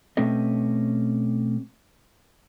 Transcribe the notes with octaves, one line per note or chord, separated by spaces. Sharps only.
B2 A3 C4 C#4 G4 D#5